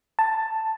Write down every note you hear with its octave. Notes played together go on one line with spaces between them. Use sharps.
A5